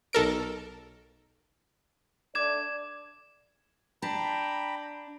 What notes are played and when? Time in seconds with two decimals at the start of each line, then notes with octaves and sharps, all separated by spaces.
0.13 B1 A4 A#4 D7
2.35 A3 D4 D5 D6 G#6 E7
4.02 D4 G5 A#5 B5